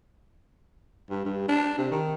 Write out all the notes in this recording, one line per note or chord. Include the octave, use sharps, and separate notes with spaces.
G2
G2
D4
C3
D#3